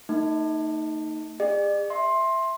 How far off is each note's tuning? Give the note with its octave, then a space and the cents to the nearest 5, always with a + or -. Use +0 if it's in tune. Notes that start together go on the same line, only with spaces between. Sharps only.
A3 +45 D#4 +0
G#4 -40 D5 +40
E5 +0 C6 +15